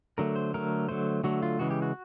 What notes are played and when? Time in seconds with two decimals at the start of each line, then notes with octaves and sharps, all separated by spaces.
0.18 D3 F#3 A3 A#4
0.36 C5
0.54 D3 F#3 A3 A#4
0.89 D3 F#3 A3 C5
1.24 D3 F#3 A3 F#4
1.43 F4
1.59 C#3 E3 G#3 F#4
1.71 G4
1.82 F#4